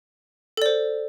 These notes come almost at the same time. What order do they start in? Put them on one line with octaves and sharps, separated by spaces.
A4 D5 C5